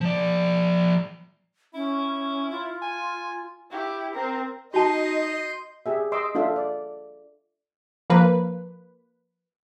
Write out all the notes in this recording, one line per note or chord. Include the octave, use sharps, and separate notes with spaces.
F3 D5
C#4 E4
F4
G#5
E4 G4
C4 A#4
D#4 F#4 D#5 A5 C6 G6
G4 G#4 E5
D#5 C6 D6 E6
D4 F4 A4 E5
D5
F3 A#3 B4